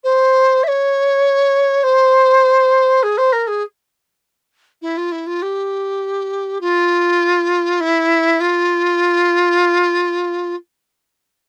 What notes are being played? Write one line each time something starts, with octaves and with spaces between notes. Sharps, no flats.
C5
E5
C#5
C5
G#4
C5
A#4
G#4
E4
F4
E4
F4
G4
F4
E4
F4